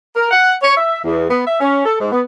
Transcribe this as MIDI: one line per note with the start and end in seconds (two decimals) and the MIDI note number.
0.16 0.29 70
0.31 0.52 78
0.62 0.76 73
0.77 0.99 76
1.04 1.26 40
1.30 1.43 59
1.46 1.56 76
1.61 1.83 61
1.85 1.96 69
1.99 2.12 44
2.12 2.21 59